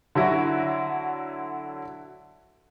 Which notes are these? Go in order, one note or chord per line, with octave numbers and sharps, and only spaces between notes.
D3 F#3 E4 F#4